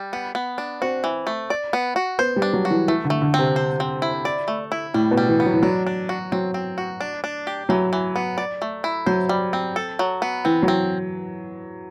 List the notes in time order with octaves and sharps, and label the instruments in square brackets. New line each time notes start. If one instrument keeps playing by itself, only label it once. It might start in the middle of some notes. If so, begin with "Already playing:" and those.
Already playing: [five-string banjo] G3
B3
B3
D4
[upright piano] C4 [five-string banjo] F#4
[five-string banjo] E3
A3
D5
B3
F#4
[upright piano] B3 [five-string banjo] C5
[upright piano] G3
[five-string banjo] D4
[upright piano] F#3
[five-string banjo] F#4
[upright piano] E3
[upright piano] E3 [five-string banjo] A3
[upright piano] D3
[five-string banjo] A3
[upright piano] D3
[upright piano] C3 [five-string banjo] C4
[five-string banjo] C5
C4
E4
D5
A3
E4
[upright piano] A2 [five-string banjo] G3
[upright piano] B2
[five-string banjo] G3
[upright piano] E3
[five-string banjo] B3
[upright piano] F#3
E3
[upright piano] F#3 [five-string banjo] D4
[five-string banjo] D4
F#4
[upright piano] F#3 [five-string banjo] C4
[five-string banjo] C4
F#4
D4
D4
G4
[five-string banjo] E3 [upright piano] F#3
[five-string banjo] E3
B3
D5
A3
E4
[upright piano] F#3 [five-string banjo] C5
[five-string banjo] G3
C4
A4
F#3
B3
[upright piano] E3 [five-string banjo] C4
[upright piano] F#3
[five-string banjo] C4